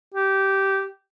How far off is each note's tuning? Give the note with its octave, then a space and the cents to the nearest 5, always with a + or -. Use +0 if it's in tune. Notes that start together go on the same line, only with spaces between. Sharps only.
G4 -15